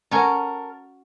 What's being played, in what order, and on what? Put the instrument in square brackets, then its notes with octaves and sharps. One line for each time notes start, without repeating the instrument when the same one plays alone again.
[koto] C#4 F#4 G#5 [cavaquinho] A4 A#4